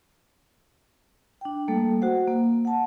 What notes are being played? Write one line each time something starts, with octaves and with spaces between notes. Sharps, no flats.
D4 G5
G3 A3 A#3 A4
F#4 C5 F#5
A#3
F#5 A5